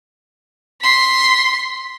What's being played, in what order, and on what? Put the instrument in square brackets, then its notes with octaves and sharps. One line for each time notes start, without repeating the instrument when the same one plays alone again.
[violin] C6 B6